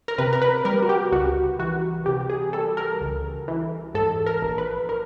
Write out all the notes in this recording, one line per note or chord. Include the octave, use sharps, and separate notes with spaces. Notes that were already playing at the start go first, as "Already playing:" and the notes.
A#4
C3 B4
A#4
B4
G3 A#4
F#4
G4
C#2 F#4
E3 F#4
C3 G4
G#4
G3 A4
A#4
C#2
E3
G#2 A4
A#4
A#1
B4
A#4